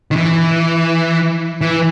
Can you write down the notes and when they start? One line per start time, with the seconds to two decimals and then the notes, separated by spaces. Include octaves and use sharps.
0.11 D#3
0.16 E3
1.61 E3